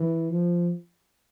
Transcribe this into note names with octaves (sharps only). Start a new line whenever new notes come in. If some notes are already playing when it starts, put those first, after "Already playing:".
Already playing: E3
F3